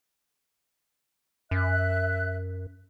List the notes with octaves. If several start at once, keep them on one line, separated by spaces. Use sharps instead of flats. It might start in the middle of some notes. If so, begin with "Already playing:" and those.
F#2 E5 F#6